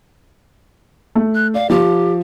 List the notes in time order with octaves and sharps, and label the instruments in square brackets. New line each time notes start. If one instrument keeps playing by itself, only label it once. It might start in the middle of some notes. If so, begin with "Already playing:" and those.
[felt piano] A3
[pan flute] F#6
[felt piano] D5 [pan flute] F5
[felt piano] F3 [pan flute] G4